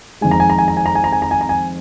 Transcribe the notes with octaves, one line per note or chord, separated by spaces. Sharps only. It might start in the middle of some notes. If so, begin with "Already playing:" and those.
F2 D#3 G#3 G#5
A#5
G#5
A#5
G#5
A#5
G#5
A#5
G#5
A#5
G#5
A#5
G#5
A#5
G#5